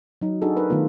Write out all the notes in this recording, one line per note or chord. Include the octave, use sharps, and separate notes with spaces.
F#3 D#4
D4 D#4 F#4 G#4 A4
D#4 A#4 B4
D#3 A3 B3 F4